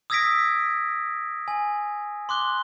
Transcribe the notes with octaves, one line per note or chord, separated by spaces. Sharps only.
D#6 E6 G#6 A#6 B6 D7
G#5
C6 D6 F#6 G7